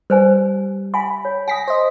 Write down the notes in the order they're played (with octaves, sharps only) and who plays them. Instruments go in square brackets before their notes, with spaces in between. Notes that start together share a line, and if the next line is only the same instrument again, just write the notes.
[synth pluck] G3 [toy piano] B4 C5 G#5
[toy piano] E5 G#5 [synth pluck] B5
[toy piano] C#5
[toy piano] G#5 D#6 [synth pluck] A#6 B6
[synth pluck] C5 D#5